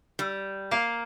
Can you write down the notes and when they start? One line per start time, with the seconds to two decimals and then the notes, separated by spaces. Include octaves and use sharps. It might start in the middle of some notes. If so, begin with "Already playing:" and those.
0.19 G3
0.71 A#3 F5